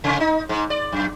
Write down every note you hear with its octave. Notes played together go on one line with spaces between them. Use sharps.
C3
D#4
G#2
D5
F#2